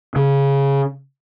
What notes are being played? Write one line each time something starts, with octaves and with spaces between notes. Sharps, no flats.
C#3